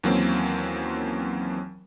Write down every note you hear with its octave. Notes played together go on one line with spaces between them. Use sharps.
D#2 E3 F#3 A#3 C4 C#4